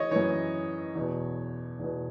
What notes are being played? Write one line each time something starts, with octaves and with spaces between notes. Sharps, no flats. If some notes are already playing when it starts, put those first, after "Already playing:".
Already playing: E3 C#5 D#5
F#2 E3 C#5
E2 B2
E2 B2